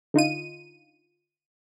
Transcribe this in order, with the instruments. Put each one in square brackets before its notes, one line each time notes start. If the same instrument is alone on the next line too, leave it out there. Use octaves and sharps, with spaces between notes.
[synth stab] D3 D#4 F4 D#7